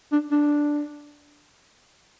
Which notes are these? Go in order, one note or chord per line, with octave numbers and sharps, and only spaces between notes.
D4
D4